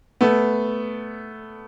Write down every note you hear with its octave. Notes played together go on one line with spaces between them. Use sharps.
A3 B3